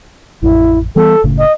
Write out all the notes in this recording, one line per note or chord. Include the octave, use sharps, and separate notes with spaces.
A1 F2 E4
E3 G3 B3 A4
F#1 A2 C#3
D#5